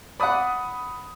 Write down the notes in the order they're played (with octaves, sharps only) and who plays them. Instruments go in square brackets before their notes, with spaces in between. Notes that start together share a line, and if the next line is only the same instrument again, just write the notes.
[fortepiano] D5 F#5 [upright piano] B5 D#6